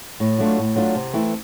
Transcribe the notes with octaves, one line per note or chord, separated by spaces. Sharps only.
A2
F#3 A3 D4 F4
A2
F#3 A3 D4 F4
C3
E3 A3 C4 E4